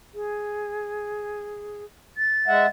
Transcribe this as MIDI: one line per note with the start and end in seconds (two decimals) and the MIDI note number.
0.14 1.84 68
2.17 2.69 93
2.48 2.66 56
2.48 2.66 76
2.48 2.66 78